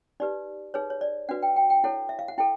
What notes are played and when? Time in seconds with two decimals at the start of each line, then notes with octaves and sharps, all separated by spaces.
0.20 D#4 G4 B4 D5
0.74 D#4 G#4 B4 C#5
0.90 C#5
1.01 D5
1.29 D4 F#4 B4 F#5
1.42 G5
1.56 G5
1.70 G5
1.84 E4 A4 C#5 F#5
2.09 E5
2.19 F5
2.28 F#5
2.38 E4 A4 G5